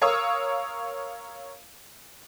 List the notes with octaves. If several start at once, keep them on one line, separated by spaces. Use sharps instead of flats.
A#4 C#5 F5 C#6 D#6 E6